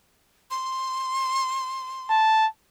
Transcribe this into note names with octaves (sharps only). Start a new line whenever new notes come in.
C6
A5